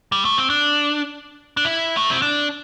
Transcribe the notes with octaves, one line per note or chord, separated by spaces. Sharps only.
G3
A3
C4
D4
D4
E4
A3
C4
D4